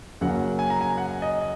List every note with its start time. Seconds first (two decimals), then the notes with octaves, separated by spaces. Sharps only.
0.21 F#2 C#3 F#3 A#3 F#5
0.59 G#5
0.70 A#5
0.81 G#5
0.97 F#5
1.22 D#5